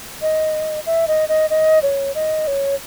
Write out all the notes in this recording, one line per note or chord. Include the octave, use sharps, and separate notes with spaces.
D#5
E5
D#5
D#5
D#5
C#5
D#5
C#5